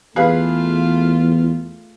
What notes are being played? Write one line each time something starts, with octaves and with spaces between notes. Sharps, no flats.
E2 A3 F4 G#4 B4 F5